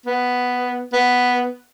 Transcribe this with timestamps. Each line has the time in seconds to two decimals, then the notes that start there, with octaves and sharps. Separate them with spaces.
0.06 B3
0.93 B3